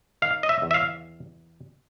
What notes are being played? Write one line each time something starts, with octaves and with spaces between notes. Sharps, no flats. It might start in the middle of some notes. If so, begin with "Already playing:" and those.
D#3 F5
D#5
E5
E2
E5
F5